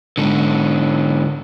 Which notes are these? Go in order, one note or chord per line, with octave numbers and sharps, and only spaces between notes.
G#2 D3